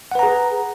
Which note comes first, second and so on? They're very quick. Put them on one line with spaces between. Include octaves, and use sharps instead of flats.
F#5 B4 A#5 G#4